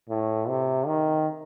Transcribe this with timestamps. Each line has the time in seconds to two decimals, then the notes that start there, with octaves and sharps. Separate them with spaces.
0.09 A2
0.49 C3
0.87 D#3